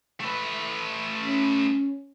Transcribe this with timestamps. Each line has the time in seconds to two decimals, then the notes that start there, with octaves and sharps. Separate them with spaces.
0.20 A3 B4
1.22 C#4